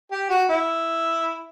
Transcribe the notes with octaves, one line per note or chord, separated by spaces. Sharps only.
G4
F#4
E4